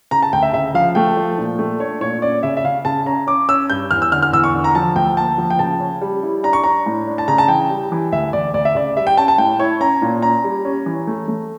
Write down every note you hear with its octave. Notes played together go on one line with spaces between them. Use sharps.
C#3 A#5
A5
D2 G5
E5
C#3 E5
F3 F5
A3 G5
F3
A#2
A3
D4 C#5
A#2 C#5
C#4 D5
C#3 E5
E5
C#3 F5
C#3 A5
C#4 A#5
C#4 D6
C#4 E6
G2 G6
E2 F6
E6
D3 F6
F6
E2 E6
C#6
D3
A#5
F3 A5
D2 G5
A#3 A5
F3
G5
C#3 A5
C#4
G3
E4
D4 A#5
C#6
D4 A#5
A2
D4
A5
C#3 A#5
A5
E3 G5
G3
E3
D2 E5
D2 D5
D2 D5
E5
C#3 D5
G3 E5
G5
C#4 A5
A5
A2 G5
E4 C#5
C#4 A#5
A#2
C#4 A#5
G3
C#4
E3
A3
A3